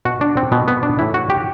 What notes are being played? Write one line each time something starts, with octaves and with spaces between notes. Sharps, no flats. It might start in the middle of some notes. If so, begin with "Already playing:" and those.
B2 F#4
D4
C4
B2 B3
B3
D4
A2 E3 E4
F#4
G4